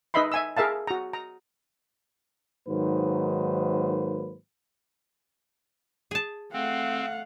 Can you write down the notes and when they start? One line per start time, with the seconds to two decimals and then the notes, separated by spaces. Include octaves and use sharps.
0.14 D#4 B4 D#5 E5 B5 C6
0.32 E5 G#5 E6
0.57 G#4 A#4 E5 F5 A5
0.87 F#4 A#5
1.13 A#5
2.68 G#2 D#3 F#3 A#3 B4 C5
6.11 G#4 A5
6.53 A3 C4 F5 F#5